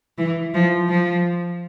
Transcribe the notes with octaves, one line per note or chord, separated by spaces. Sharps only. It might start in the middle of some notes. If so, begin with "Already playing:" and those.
E3
F3
F3